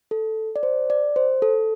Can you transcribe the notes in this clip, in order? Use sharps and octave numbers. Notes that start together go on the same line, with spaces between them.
A4
D5
C5
D5
C5
A4